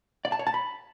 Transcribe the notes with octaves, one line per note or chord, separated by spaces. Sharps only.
D5
A5
C#5
A5
B5